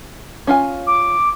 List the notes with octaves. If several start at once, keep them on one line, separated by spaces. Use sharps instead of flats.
C#4 F4 G#5
D6